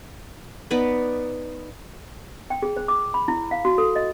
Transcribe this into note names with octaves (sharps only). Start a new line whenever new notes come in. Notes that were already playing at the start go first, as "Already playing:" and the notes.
B3 D#4 B4 D5
G5
G#4
C5
D6
B5
E4
F5
F#4
A4
D#5